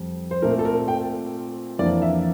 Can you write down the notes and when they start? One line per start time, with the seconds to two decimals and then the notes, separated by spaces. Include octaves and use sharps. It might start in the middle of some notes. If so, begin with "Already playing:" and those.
Already playing: F2 G3
0.31 C5
0.42 A#2 A3 C4 A#4
0.59 A4
0.65 A#4
0.88 G5
1.79 F2 E3 A#3 D4 D5
2.02 E5